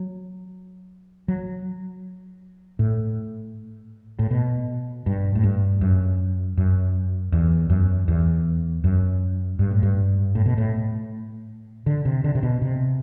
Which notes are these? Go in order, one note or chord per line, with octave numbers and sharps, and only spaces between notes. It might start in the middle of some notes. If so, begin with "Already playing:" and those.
Already playing: F#3
F#3
A2
A2
B2
G2
A2
G2
F#2
F#2
E2
F#2
E2
F#2
G2
A2
G2
A2
B2
A2
D3
C3
D3
C3
B2
C3